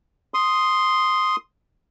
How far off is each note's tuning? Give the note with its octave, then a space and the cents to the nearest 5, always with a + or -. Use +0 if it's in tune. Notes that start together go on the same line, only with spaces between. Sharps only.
C6 +0 D#6 +0